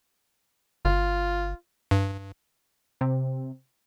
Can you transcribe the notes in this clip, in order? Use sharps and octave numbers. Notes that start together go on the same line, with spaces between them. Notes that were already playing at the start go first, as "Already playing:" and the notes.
G1 F4
G2
C3